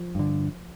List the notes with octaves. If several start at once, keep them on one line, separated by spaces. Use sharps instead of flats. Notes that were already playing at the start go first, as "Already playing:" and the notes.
Already playing: F3
G2 D3